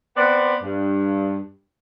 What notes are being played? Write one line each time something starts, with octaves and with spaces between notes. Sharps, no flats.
B3 C4 D5
G2